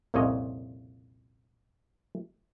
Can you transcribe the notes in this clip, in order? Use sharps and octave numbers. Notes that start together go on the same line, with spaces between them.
C2 F2 A#2 C#3 C#5 D#5